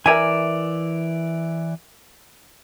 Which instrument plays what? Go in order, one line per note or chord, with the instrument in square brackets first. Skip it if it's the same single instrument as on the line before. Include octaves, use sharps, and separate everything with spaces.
[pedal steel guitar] E3 D5 [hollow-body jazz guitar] A#4 E5 G#5